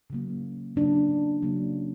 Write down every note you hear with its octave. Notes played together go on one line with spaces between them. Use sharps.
C#3 F#3 A#3
C#3 F#3 A#3 D4
C#3 F#3 A#3